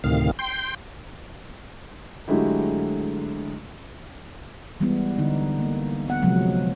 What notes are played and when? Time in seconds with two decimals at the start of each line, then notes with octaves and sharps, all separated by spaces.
0.04 D2 A2 C3 D#3 F5
0.39 G5 C6
2.28 D3 F#3 G#3 A3 E4 G4
4.80 E3 G3 G#3 B3 E4
5.18 D3 D#4
5.59 A#3
6.08 B3 F#5
6.23 C3 F3 F#3 G#3